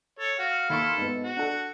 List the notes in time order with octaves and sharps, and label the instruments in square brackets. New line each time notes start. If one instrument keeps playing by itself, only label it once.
[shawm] A4 [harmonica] C#5
[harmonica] F#4 [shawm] F5
[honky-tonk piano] D#2 C6 C#6 [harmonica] E4 A4
[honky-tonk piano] G#2 B3
[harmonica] F#4
[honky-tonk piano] D4 A4 [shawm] F#5